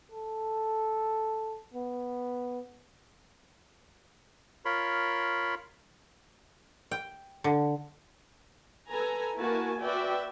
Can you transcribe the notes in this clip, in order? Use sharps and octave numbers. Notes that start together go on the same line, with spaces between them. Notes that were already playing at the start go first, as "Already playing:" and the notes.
A4
B3
F4 A#4 C#5 B5 C6
G5
D3
A4 B4 G#5 A#5
A#3 E4 F#4 A#4 G#5 A5
F#4 B4 D5 E5 G5